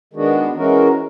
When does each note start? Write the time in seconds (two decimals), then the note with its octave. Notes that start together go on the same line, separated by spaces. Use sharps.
0.13 D#3 G#3 B3 D4 F#4
0.54 E3 G#3 C#4 F#4 A#4